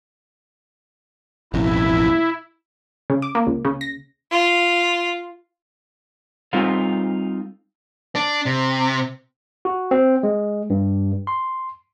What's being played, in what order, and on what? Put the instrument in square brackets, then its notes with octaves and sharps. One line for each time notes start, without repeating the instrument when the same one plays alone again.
[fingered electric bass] E1 A1 F2 [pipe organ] E4
[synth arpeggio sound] C#3
D6
A#3
C#2
C#3
A#6
[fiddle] F4
[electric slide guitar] G3 C4 D#4 F4 A4 F5
[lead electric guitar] D4
C3
[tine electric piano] F#4
C4
G#3
G2
C6